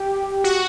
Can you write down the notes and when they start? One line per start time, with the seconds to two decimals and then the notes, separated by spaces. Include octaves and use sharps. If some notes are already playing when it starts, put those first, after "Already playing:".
Already playing: G4
0.44 F#4